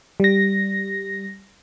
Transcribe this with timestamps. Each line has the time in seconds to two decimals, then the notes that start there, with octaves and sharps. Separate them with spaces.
0.20 G3 A#6